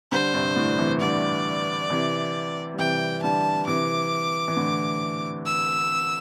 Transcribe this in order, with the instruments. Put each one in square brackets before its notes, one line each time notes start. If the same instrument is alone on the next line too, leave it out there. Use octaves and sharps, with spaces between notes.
[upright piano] D3 G3 [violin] C5
[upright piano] G2 C3
A2 D3
C3 E3
[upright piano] D3 G3 [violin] D5
[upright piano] C3 E3
G3
[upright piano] C3 E3 [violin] G5
[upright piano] D3 G3 [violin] A5
[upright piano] C3 E3 [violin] D6
[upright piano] E3
A2 D3
[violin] E6